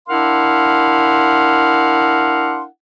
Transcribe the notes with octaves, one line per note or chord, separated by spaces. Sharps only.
D4 E4 A#4 F5 F#5 C6